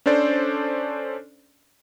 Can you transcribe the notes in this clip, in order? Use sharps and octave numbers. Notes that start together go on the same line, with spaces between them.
C#4 D4 A4 C5 D5